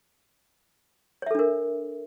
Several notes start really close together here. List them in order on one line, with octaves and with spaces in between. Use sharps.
C#5 E5 A4 D4 A#4